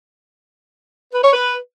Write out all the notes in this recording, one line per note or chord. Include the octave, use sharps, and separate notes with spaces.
B4
C#5
B4